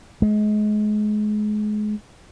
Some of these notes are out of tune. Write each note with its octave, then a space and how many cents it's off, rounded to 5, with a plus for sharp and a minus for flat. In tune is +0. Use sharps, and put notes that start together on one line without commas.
G#3 +30